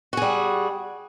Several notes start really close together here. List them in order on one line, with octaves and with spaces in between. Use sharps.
F#4 G#4 G3